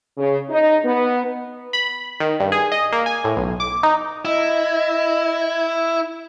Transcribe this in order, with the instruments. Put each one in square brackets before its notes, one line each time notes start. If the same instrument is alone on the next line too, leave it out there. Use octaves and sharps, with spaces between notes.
[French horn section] C#3
D#4
B3
[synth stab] B5
D#3
G2
G#4
D#5
A#3
G#5
A2
B1
D6
D#4
[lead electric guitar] E4 [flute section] D#5